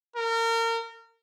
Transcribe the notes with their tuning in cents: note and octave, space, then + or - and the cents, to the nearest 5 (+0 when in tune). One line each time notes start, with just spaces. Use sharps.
A#4 -30